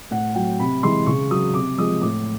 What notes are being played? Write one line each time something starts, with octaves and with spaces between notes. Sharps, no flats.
A2 F#5
F#3 G5
C3 B5
E3 G#3 C6
C#3 C#6
F#3 D#6
C3 D6
F3 G#3 D#6
A2 D6